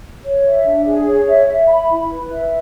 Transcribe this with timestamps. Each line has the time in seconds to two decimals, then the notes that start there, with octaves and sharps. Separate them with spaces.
0.25 C#5
0.45 E5
0.66 D4
0.86 G#4
1.07 C#5
1.28 E5
1.49 E5
1.69 B5
1.90 E4
2.10 B4
2.31 E5